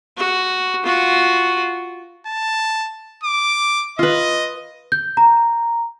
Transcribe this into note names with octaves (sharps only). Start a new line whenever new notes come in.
F#4
F4 F#4
A5
D6
F4 B4 D#5
G6
A#5